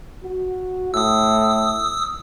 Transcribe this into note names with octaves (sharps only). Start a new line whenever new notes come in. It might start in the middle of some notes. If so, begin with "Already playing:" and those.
F#4
A2 D#6 E6